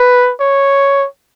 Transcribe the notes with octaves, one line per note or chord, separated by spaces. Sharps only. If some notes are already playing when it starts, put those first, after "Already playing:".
Already playing: B4
C#5